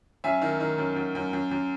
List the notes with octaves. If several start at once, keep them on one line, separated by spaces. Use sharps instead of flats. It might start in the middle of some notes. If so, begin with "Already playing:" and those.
F#2 E5 G#5
D#3
D#3
F#2
F#2
F#2
F#2
F#2